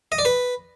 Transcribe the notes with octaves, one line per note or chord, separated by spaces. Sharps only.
D#5
D5
B4